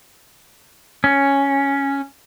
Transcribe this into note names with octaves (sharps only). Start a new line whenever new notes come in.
C#4